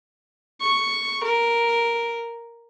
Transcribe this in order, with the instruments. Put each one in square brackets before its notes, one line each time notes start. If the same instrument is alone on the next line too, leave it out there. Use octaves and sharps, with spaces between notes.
[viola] C#6
A#4